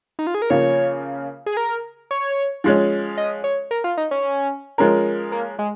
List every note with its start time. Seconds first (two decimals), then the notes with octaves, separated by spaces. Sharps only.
0.19 D#4
0.27 F4
0.34 G#4
0.42 A#4
0.50 C#3 F3 A#3 C#5
1.46 G#4
1.57 A#4
2.11 C#5
2.64 F3 G#3 C#4
3.17 D#5
3.44 C#5
3.71 A#4
3.84 F4
3.97 D#4
4.11 C#4
4.78 F3 G#3 C#4 A#4
5.32 A#3
5.59 G#3